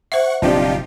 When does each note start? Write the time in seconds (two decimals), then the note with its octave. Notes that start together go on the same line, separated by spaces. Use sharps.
0.12 C5 E5 F#5 C#6
0.42 F#1 B2 F3 C4 D4 D#4 F4 G4